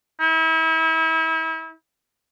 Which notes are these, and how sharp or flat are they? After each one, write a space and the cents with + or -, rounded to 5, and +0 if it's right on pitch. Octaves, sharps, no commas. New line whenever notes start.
E4 -35